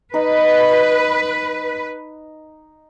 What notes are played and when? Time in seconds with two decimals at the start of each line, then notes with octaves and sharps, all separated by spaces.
0.14 D#4 B4